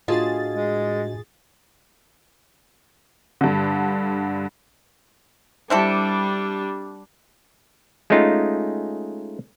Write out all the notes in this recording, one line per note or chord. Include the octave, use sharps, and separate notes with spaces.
A2 D4 F4 F#4 G#4 D#5 A5 A6
G#3
G2 D3
G3 C4 D4 E4 A4
G#3 A3 C#4 D#4 F4